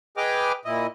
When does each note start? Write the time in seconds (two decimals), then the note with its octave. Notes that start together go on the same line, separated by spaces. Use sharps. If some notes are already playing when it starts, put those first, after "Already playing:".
0.17 G#4 B4 D#5 G5 D6 F6
0.65 A#2 E4 D#5